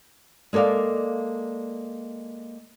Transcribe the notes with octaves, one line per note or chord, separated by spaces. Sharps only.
G#3 A#3 A4 D5 F5